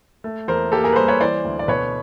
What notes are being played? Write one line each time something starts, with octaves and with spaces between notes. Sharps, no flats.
A3
E2 A#4 C5
A#3 G4 A4
G#4 A#4
B4
G3 A#4 C5
B4 C#5
E3 C5 D5
D2
D5
B2 B4 C#5